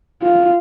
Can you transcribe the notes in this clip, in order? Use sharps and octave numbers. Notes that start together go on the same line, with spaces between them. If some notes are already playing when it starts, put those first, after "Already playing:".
F4